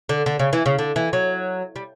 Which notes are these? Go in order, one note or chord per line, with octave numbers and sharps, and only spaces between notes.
D3
D3
C#3
E3
C#3
D3
E3
F#3
G3